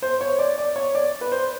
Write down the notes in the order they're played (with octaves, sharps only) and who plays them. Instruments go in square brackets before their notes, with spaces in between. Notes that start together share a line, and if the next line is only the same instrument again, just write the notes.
[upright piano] C5
C#5
D5
D5
C#5
D5
B4
C5